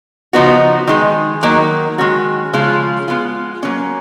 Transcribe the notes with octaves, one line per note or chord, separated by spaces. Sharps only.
C#3 F3 B3 D#4 F#4
D#3 G#3 D#4 G#4
D#3 F#3 A#3 D#4
D#3 G#3 C#4 F#4
C#3 F3 G#3 C#4 F4
G#3 B3 F4
F#3 A#3 C#4